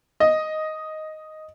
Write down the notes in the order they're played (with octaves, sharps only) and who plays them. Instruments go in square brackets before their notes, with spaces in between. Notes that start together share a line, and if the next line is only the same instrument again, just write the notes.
[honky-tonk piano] D#5